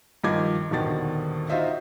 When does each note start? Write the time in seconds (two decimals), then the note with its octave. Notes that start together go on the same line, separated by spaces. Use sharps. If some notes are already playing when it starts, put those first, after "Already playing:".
0.24 G2 D#3 F3 D#5 D6 G#6
0.71 D#1 B2 D3 D#3 A6
1.50 D#4 F4 F#4 C5 D#5 E5